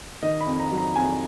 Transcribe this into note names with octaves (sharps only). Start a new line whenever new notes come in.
D#3 D#5
B5
F2
A#5
F#3
A#5
F2 G#5